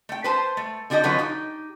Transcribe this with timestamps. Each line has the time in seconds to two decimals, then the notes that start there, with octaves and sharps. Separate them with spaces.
0.09 A3 G5
0.24 B4 C5 A5
0.57 A3
0.90 D3 D4 F#4 G4 D#5
1.03 D3 F3 F#3 C#4 B4
1.18 D#4 G4